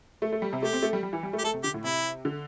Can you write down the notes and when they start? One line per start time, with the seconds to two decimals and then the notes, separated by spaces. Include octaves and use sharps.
0.22 A3
0.32 A3
0.42 G3
0.53 C3
0.63 A3 G4
0.73 C4
0.82 A3
0.93 G3
1.03 G3
1.13 E3
1.23 G3
1.33 A3
1.38 G4
1.43 A3 A4
1.54 C3
1.63 D3 G4
1.74 A2
1.84 C3 E4
2.25 D3